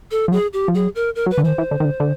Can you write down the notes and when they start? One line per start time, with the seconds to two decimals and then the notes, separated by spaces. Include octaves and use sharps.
0.11 A4
0.28 F3
0.32 F#3 G#4
0.53 G4
0.68 F3
0.75 F#3 G#4
0.95 A#4
1.16 A#4
1.26 F#3
1.31 B4
1.38 D3
1.43 D#3 E3 C5
1.58 E3
1.71 D3
1.80 D#3
1.85 D3
2.00 D3